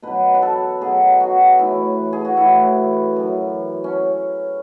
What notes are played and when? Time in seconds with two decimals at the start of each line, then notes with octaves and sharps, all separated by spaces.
0.02 B2 F#3 B4
0.34 B4
0.42 A4
0.81 B2 F#3 G#4
1.20 F#4
1.59 A2 E3 E4
2.13 G#4
2.25 F#4
2.37 A2 E3 E4
3.16 F#2 E3
3.84 C#4